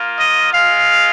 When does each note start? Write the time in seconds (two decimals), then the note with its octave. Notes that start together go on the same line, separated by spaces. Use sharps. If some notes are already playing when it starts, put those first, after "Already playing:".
Already playing: A#3 F4
0.19 D#5
0.53 G#3 F4 F5